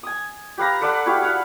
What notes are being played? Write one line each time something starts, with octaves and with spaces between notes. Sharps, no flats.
G#5 D#6
G4 B4 F5 A#5
A4 B4 D5 F#5
E4 F#4 G4 F5
G#4 F5 F#5